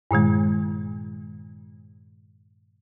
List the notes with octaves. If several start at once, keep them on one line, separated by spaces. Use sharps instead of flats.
G2 A#2 D#3 G#3